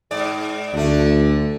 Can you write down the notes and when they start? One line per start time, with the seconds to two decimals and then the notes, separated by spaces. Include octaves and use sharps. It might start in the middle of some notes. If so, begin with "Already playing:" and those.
0.11 G#2 D5
0.74 D2 D3 A3